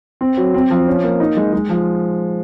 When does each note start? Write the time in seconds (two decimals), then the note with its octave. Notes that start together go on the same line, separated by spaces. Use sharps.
0.21 C4
0.37 F#3
0.54 C4
0.70 F3
0.88 C#4
1.04 A#3
1.20 D#4
1.37 G#3
1.53 G#3
1.69 F3